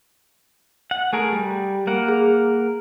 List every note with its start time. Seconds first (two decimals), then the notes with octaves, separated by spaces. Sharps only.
0.91 F#5
1.13 A3 G#4 A#4
1.32 G3
1.87 A#3 A#4 F#5
2.08 G#4